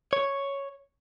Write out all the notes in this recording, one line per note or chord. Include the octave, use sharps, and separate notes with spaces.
C#5